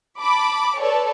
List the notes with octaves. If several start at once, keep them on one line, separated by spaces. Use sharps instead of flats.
A5 B5 D6
A4 B4 C#5 D5